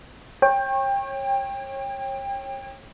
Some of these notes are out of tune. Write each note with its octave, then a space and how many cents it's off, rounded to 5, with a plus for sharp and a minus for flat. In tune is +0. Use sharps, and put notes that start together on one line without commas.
C#5 -30 G5 +20